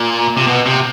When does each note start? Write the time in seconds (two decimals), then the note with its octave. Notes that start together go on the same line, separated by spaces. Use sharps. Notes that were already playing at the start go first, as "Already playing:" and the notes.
Already playing: A#2
0.37 C3
0.47 B2
0.66 C3